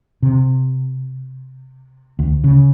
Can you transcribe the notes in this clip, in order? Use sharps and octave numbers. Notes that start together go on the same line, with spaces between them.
C3
D2
C#3